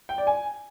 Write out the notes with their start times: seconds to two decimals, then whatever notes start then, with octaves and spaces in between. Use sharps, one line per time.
0.09 G5
0.18 D5
0.27 G#5